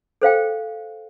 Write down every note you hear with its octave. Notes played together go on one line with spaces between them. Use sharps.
A4 C5 F5 G5